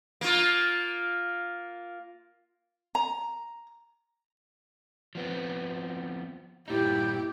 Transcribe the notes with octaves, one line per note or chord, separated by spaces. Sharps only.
A#3 F4
A#5
F3 B3 C4
G2 A#2 D#4 E4 G4